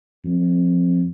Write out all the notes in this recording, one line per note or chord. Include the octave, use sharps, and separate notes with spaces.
F2